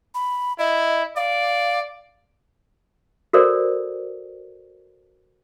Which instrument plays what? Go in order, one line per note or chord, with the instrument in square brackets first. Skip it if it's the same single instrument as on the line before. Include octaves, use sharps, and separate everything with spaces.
[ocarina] B5
[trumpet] E4 [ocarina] D#5
[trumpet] D5 [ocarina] F5
[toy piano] F#4 A4 A#4 C5 D5